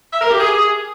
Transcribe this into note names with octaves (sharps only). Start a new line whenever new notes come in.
E5
A#4
G4
G#4